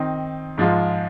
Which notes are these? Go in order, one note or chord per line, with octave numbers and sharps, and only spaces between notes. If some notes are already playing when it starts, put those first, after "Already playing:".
Already playing: D#3 C4 D#4
G#2 F3 G#3 F4